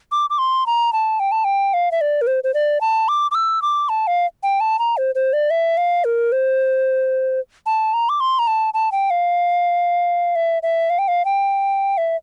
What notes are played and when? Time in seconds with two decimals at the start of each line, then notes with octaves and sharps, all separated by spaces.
0.12 D6
0.30 D6
0.38 C6
0.66 A#5
0.93 A5
1.20 G5
1.32 A5
1.44 G5
1.74 F5
1.92 E5
2.01 D5
2.22 A#4
2.27 C5
2.44 C5
2.54 D5
2.81 A5
3.08 D6
3.31 D6
3.35 E6
3.62 D6
3.89 A5
4.07 F5
4.43 G5
4.60 A5
4.79 A#5
4.97 C5
5.15 C5
5.33 D5
5.50 E5
5.77 F5
6.04 A#4
6.32 C5
7.66 A5
7.94 A#5
8.09 D6
8.20 C6
8.39 A#5
8.47 A5
8.74 A5
8.92 G5
9.10 F5
10.36 E5
10.63 E5
10.90 F5
10.99 G5
11.08 F5
11.25 G5
11.98 E5